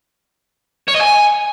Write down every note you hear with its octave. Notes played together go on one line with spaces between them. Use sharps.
C#5
D#5
G#5